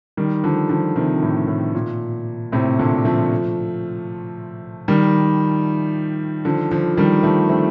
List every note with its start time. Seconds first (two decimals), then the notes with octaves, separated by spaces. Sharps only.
0.17 D#3 G3
0.44 D3 F3
0.69 D3 F3
0.96 C3 D#3
1.22 A2
1.48 A2
1.75 A#2
2.52 A2 C3
2.79 A#2 D3
3.05 F3 A3
4.88 D#3 G3
6.45 D3 F3
6.71 D3 F3
6.97 D#3 G3
7.23 F3 A3
7.49 A3 C4